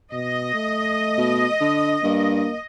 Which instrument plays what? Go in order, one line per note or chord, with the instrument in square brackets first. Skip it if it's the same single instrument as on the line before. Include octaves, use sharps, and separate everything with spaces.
[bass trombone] B2 [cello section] D#5
[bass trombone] A3
[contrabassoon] B2
D3
[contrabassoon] G2 [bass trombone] A#3